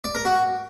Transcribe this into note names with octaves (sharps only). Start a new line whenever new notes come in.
D5
A#4
F#4